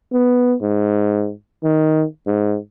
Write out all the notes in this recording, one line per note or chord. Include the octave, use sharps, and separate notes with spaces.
B3
G#2
D#3
G#2